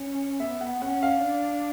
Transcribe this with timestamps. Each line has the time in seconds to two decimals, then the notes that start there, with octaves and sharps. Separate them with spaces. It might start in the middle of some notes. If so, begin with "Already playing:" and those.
Already playing: C#4
0.39 B3 E5
0.61 F#5
0.82 C#4 F#5
1.03 F5
1.24 D4